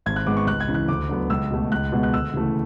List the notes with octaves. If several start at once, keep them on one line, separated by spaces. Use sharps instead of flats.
G#1 G#6
F#6
G#2 G#3 B3 D6
C#6
C#2 F#6
G#6
C#3 E3
F#6
D2 D6
D3 F#3 B3
C#2 E6
B2 A3
C#2 F#6
B2 G#3 B3
F#6
D2 E6
C#3 E3 A3